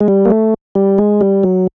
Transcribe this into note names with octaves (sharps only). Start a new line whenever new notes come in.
G#3
G3
A#3
A3
G3
G#3
G3
F#3